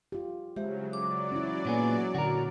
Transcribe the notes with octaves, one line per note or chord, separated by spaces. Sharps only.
F4 G4
C#3 F#3 G#3 G4 C5 E5
F#3 D5 D6
C#4 E4
A#2 B3 G#4
A#2 D3 F#4 A#4